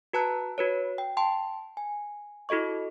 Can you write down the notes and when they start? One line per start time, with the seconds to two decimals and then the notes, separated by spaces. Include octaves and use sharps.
0.13 F#4 B4 A5 A#5 F#6
0.58 F#4 B4 C#5
0.98 G5
1.17 G5 A5 C6
1.77 G#5
2.49 E4 F#4 A4 D#5 C#6